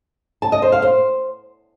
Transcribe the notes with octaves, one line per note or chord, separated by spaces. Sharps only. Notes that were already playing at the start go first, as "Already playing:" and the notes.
A5
D#5
C5
F5
C5